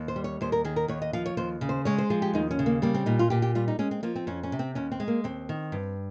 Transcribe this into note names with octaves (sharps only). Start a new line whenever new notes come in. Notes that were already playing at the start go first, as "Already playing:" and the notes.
Already playing: D#2
C5
G3
C#5
D#2 C5
A#4
D#3 G#4
A#4
D#2 C#5
D#5
F3 F5
C#5
D#2 C5
C#3
C5
G#3 C#5
C5
F3 G#4
G4
D#2 D#4
C#4
C#3
A#3
G3 A#3
C4
A#2 D#4
F4
A#2 G4
G4
G3 F4
D#4
G#3 C#4
C4
F3 A#3
C4
F2 C#4
C#4
C3
C4
D#2 C#4
C4
G#3
A#3
D#2 C4
D#3
G2